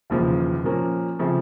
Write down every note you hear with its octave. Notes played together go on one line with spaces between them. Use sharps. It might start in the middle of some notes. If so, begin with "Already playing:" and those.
E1 D#2 C#3 F3
A#2 F3 A#3 C#4
C#3 F3 A3 C4